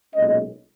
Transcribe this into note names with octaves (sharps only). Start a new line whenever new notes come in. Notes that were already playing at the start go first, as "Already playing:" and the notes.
B1 A#2 G#3 C#4 D#5